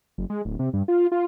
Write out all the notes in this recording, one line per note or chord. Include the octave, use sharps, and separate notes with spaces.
F#1
G#3
D1
C3
G2
F4
F4